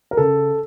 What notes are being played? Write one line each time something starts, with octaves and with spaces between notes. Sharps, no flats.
A#4
C#3 A4